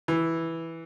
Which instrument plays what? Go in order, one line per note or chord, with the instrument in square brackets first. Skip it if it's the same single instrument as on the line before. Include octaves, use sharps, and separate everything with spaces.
[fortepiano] E3